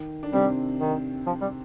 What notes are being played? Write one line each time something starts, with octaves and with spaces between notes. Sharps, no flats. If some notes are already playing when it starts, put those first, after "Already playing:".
Already playing: D#3
D4
C3 G3 C4
D#3
F3
G3